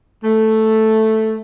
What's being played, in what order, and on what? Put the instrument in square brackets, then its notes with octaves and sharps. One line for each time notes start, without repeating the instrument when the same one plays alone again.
[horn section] A3